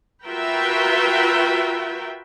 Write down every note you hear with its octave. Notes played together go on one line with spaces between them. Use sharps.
F4 F#4 A#4 B4 E5 G5